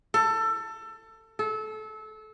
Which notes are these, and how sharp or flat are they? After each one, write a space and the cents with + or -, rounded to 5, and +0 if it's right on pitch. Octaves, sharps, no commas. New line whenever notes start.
A4 +20
A4 -25